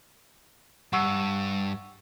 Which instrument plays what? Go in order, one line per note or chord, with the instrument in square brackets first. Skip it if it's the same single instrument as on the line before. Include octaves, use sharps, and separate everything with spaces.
[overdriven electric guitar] G2 [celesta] F#5 C#6 E6